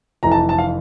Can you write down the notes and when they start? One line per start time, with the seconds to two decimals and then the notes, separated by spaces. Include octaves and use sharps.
0.23 F1 F2 E3 A#5
0.32 A5
0.49 A5
0.58 F5